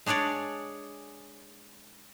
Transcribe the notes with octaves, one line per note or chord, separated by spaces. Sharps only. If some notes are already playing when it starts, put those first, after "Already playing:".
G#3 D4 G#4 C#5 D5